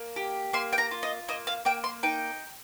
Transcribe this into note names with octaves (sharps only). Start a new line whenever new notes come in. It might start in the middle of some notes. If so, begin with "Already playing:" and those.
Already playing: A#3
G4
A#3 C6
G5
A#5
F4
D#5
A#3 D#5
F5
A#3 G5
C6
D#4 G5